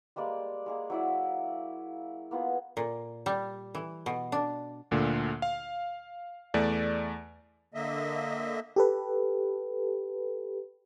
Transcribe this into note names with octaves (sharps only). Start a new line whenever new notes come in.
G3 G#3 A#3 D5
G#3 A#3 G#4
F#3 E4 D5
A#3 B3 F4 G#4
A#2
G3
E3
B2
D4
D2 A#2 D3
F5
E2 A3 D5
D3 A#3 D#5 E5
G4 A4 B4